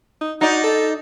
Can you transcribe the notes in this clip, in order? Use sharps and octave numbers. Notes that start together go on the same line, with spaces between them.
D#4
D#4 F#4 D5
A4